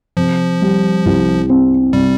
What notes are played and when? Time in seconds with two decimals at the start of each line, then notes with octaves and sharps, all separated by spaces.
0.17 C3 F3
0.61 G3
1.05 C2
1.49 C4
1.93 C3 G3